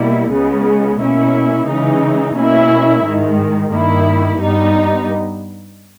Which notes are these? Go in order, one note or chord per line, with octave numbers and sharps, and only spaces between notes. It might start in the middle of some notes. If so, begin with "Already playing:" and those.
Already playing: B2 G3 A#3 E4
C#2 C#3 G#3 B3
B2 A#3 C#4 E4
C#3 E3 G#3 D#4
B2 A#3 C#4 E4
G#2 D#3 G#3
G2 D#3 A#3 E4
G2 G3 B3 D#4